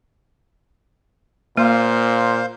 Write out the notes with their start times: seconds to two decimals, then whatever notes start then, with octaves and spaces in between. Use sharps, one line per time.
1.57 A#2 A#3 C5 F5